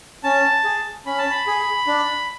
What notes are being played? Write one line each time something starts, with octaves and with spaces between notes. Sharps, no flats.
C#4 A5
G#4
C#4 B5
A5
B5
G#4
D4